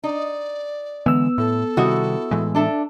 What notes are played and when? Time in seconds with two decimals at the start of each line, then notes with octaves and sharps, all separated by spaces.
0.04 D#4 D5
1.06 D3 E3 G#3 B3 E6
1.38 A2 A4
1.77 C3 D#3 G3 D#4 E4 F#4
2.31 A2 E3 G#3
2.55 D4 A4 E5